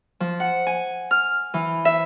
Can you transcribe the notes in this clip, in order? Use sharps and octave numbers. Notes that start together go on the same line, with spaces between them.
F3
F#5
G#5
F6
E3
E5